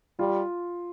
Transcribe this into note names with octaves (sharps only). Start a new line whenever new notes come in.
G3 F4